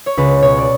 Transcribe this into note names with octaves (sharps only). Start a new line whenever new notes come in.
C#5
C#2 B4
B2 C#5
D5